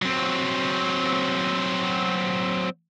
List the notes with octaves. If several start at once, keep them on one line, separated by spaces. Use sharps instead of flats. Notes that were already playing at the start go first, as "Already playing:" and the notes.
F#3 C4